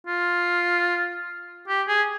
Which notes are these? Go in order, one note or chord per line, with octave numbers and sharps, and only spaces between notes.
F4
G4
G#4